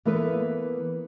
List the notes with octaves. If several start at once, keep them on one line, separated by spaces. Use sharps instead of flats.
E3 A#3 B3 E4 A4 B4